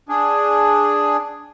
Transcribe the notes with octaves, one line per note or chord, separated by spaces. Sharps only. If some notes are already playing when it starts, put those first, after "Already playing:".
D4 G#4